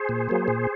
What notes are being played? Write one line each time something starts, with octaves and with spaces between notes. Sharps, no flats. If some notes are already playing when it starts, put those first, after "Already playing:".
Already playing: G#4 C5
A#2
F#3 A#3
A#2